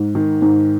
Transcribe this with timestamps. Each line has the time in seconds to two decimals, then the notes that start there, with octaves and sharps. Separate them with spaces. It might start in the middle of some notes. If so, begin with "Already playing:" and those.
Already playing: G#2
0.15 D#3
0.42 G#2